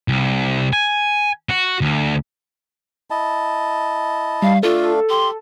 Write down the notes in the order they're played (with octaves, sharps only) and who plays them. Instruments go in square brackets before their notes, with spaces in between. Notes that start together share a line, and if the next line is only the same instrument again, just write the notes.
[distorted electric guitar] C2
G#5
F#4
D2
[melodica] E4 D#5 A5
[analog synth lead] G3 [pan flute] F5
[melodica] A3 D4 F5 [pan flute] F4 [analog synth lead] A4
[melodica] G4 [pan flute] C6